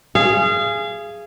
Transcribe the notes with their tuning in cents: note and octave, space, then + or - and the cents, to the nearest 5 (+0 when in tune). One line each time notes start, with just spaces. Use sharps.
G#4 +0 F5 -30